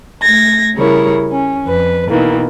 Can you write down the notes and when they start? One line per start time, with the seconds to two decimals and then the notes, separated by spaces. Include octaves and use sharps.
0.22 A3 G#6 A#6
0.75 C#3 G3 E4 G#4 A#4 C#5
1.31 C#4
1.66 F2 B4
2.11 B2 D#3 E3 A#3